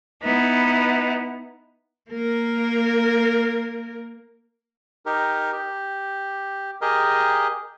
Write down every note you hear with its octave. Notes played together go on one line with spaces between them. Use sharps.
B3 D#4 E4
A#3 A#4
D#4 G4 A#4
G4
G4 G#4 A#4 D#5